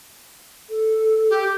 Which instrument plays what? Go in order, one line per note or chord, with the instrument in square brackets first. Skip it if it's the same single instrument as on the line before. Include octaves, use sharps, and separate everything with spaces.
[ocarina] A4
[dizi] G4